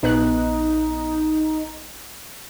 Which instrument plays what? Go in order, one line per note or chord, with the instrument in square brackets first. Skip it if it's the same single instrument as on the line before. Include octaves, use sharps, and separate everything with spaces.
[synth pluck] A#1 B3 F#6 [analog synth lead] D#4